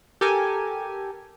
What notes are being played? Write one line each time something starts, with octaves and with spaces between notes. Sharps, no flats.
G4 A4 A#4 G#5